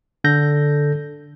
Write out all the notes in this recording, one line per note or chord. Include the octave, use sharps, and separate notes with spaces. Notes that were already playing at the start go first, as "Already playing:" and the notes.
D3 A4 G6 A#6